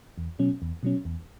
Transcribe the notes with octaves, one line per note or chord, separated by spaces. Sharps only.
E2
B2 F#3 C#4
E2
B2 F#3 C#4
E2